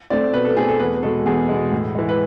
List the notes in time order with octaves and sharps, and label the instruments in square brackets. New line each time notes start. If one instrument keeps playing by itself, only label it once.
[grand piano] A3 C4 D5
B2 B4
A4
A3 C4 G#4
A4
E2 B4
B2 G#3 A4
E2 G#4
B2 G#3
A2
E3 G#3
B4